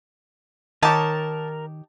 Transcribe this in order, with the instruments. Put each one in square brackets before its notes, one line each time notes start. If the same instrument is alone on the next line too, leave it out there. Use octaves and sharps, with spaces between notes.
[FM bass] D#3 [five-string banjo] D#4 G4 C#5 [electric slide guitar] A#4 [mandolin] A5